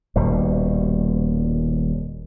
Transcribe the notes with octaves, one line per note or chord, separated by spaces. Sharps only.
D#1 D#2 B2 G3